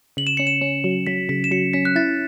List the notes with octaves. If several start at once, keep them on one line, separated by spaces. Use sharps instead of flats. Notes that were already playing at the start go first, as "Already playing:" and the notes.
C#3 F#7
E7
C#4 C#7
E7
C#4
F#3
F#3 B6
C#3 B6
E7
F#3 C#7
C#4 B6
F#6
E4 A6